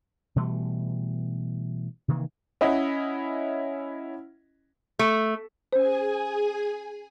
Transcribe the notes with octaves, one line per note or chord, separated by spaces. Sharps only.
B2 E3 G3 A3
C3 D#3 E3 A#3
C#4 E4 D#5 F#5
A3
C#4 G#4 C5 G#5